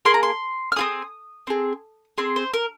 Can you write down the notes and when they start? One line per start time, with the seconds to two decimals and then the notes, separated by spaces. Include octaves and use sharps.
0.05 A#3 G#4 C6
0.14 A#5
0.23 C6
0.72 F6
0.76 C4 F4 G#4 D#6
1.47 C4 G#4
2.18 C4 G#4 C6
2.36 C5
2.54 A#4